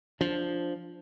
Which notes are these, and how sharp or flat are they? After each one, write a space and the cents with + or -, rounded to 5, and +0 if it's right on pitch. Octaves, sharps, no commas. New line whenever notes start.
F3 +0 D4 +0